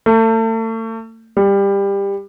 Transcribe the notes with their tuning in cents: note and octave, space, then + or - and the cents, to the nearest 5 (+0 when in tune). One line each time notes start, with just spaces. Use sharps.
A3 +35
G3 +20